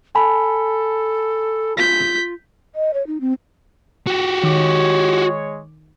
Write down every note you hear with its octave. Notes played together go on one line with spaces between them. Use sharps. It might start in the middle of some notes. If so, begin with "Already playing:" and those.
A4 G#5 A5 B5
F4 G6 B6
D#5
C#5
D#4
C4
F#4 G4
D#3 G#3 C#5 D6